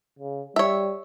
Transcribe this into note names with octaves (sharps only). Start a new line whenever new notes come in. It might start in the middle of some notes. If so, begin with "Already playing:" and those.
C#3
G3 C#5 E5